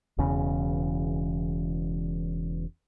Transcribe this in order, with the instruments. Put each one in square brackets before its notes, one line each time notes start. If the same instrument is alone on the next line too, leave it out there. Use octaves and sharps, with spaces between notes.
[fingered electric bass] E1 E2 C#3